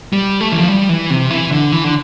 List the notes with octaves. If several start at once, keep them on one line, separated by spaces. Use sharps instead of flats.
G3
A3
E3
F3
G3
E3
C3
E3
D3
E3
D3